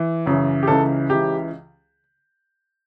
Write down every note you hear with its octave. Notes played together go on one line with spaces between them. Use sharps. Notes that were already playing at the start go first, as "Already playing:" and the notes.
Already playing: E3
F#2 C#3 E3
G4
C#2 C#3 E3 A4
C#2 C#3 E3 G4